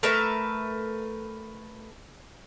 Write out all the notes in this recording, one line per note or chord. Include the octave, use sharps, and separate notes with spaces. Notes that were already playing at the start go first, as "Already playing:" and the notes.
A3 A#4 B4 E5